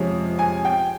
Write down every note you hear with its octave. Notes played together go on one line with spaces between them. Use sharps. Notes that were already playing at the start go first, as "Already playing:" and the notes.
Already playing: F2 C3 F3 G#3 C#4
G#5
G5